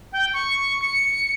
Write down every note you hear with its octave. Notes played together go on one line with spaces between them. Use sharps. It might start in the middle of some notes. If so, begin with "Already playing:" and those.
G5
C#6
C#7